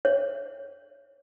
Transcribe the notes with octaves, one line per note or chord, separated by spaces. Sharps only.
C#5